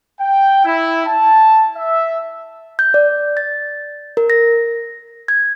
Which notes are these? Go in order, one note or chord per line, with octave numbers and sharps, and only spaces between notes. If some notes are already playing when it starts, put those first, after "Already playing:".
G5
E4
A5
E5
G6
D5
A6
A#4
A#6
G#6